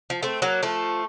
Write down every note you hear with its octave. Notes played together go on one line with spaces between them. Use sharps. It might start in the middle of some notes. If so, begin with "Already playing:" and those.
F3
A3 C4
F#3 A#3
F3 A3